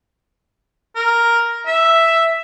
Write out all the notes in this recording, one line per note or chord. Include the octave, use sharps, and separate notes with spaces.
A#4
E5